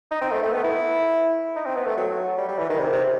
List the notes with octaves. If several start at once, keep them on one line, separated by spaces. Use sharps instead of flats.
D#4
C4
A3
A3
B3
E4
D#4
C4
B3
A3
F#3
G3
G3
E3
D#3
C3
C3